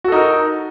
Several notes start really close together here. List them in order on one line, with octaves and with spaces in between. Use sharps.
F#4 A4 D#4 A#4